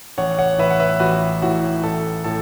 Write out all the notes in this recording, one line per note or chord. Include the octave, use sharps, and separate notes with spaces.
A1 C#5 F#5
C#5 F#5
A2 E3 B4 E5
F#5
B4 E5
A1 F#4 B4
A2 E3 F#4
A1 A4
A2 A4